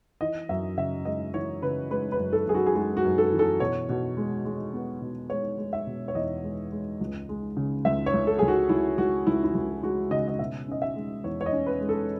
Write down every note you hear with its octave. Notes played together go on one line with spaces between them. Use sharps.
E3 D#5
F#2 E5
C#3 E5
G#3 D#5
E3 C#5
C#3 B4
G#3 B4
B4
F#2
A4
F#2 G#4
F#4
G#4
G#3 F#4
F#4
F#2
A4
E3
A4
B2 C#5
B2
G#3
G#3
B3
B2
G#3 C#5
G#3
E5
B2
C#5
E2 D#5
G#3
G#3
C#2
G#3
C#3
C#2 E5
C#5
C#2
A4
C#2 G#4
F#4
C#2 E4
C#2 F#4
C#2 E4
E4
C#2 F#4
G#3 F#4
C#3 D#5
D#5
B2 E5
C#4 D#5
E5
G#3
E2 C#5
C#5
D#5
C#4
B4
G#3
A4